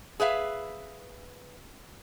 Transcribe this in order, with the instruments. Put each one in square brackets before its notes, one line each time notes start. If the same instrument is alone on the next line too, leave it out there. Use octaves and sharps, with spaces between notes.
[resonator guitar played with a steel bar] G#4 B4 E5 F5